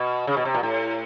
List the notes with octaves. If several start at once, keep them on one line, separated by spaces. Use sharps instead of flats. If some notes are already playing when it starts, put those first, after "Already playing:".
Already playing: B2
C#3
B2
C3
A#2
A2